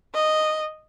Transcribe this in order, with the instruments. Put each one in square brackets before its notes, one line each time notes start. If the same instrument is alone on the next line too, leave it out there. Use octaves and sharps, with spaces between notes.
[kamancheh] D#5